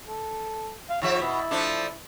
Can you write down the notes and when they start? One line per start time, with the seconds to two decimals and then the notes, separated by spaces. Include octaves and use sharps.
0.08 A4
0.90 F5
1.02 G#2 F3 C#5 E5
1.22 B2 E4
1.51 F3 A3 D4